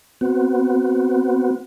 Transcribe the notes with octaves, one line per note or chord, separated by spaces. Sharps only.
B3 C4 F#4